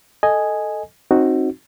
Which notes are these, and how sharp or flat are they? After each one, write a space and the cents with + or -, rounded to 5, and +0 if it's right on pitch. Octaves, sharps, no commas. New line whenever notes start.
A4 +0 D#5 +0 G#5 +0
C4 +30 D#4 +5 F#4 +0